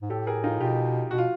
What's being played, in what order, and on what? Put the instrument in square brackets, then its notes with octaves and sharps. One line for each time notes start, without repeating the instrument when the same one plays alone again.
[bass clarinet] G#2
[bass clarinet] A2 [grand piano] G4 A4
[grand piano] G#4 A#4
D#4 F4
[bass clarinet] B2 [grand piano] F4 G4
[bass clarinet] B2 [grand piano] F#4
[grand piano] F4